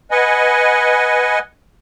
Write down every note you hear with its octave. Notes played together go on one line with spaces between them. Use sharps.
B4 D#5 F#5 G#5